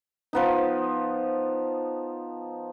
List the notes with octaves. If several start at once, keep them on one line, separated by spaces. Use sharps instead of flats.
F3 B3 D#4